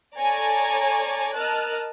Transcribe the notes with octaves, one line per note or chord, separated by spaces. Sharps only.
A4 C#5 D5 G#5 A#5
A#4 D#5 A5 F6 F#6